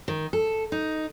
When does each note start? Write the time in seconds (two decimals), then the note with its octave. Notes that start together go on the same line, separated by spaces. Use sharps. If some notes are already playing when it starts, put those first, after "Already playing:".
0.08 D#3
0.33 A4
0.72 D#4